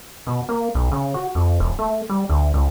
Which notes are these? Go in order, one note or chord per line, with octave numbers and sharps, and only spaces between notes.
B2
A#3
B1
C#3
F#4
F2
E1
A3
G3
D2
C#2